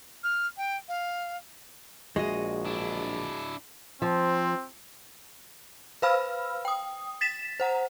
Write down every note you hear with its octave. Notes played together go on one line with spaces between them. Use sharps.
F6
G5
F5
A#1 G#3 F#4 D#5
D4 E4
F3 C4
B4 C5 F5 B5 E6 F6
G5 D#6
A6 B6 E7
C5 F#5 A#5